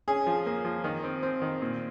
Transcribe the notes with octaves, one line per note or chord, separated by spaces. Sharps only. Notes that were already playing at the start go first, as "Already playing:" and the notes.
C#4 G#4
F3
A#3
F3
D#3
C4
C4
D#3
A#2